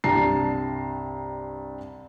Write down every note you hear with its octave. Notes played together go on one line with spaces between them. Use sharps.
C2 G2 A5 A#5 C7